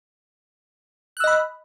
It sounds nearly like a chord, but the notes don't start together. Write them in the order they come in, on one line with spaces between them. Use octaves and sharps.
F#6 E6 D#5 B5